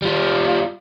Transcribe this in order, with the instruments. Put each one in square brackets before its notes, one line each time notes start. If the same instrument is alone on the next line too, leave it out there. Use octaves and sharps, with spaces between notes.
[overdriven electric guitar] G3 F4